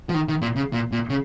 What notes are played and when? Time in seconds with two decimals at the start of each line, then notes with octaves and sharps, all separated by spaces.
0.09 F3
0.14 D#3
0.29 D#3
0.42 A#2
0.56 C#3
0.73 A#2
0.92 A#2
1.09 C#3